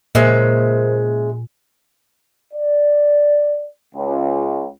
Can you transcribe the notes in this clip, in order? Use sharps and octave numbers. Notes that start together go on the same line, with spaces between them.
A#2 C#3 G#3 A#4 C5 E5
D5
C#2